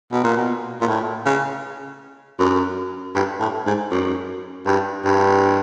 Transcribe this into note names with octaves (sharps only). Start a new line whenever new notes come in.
B2
A#2
B2
A#2
A2
C#3
F#2
G2
A2
G#2
F#2
G2
G2